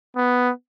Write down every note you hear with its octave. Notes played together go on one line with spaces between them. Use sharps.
B3